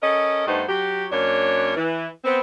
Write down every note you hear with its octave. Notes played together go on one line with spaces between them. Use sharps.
C#4 A4 A#4 D#5
G2 A3 B3 D#4 C5
F#3 G4
F#2 A#3 D4 C#5
E3
B3 C4